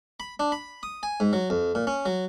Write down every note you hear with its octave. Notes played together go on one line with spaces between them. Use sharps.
B5
D4
B5
D#6
G#5
G#2
F#3
F2
A#2
C#4
F#3